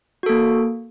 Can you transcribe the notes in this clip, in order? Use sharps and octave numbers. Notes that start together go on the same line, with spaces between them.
A#3 F#4 A4